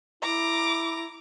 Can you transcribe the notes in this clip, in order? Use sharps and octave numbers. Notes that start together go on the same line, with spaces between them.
E4 A#5 D6